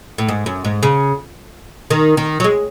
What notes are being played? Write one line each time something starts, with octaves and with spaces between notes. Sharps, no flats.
A2
G#2
F#2
G#2
C#3
D#3
D#3
F#3
G#3